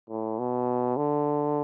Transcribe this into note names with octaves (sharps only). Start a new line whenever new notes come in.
A2
B2
D3